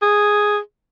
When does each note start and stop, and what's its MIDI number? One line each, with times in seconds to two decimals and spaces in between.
0.02 0.58 68